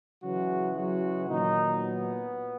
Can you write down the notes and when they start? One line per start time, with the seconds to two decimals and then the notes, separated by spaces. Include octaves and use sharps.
0.23 C#3 E3 F#3 G#3 F#4
0.76 F#3 F#4
1.28 A#2 D#3 F#3 D#4
1.80 B3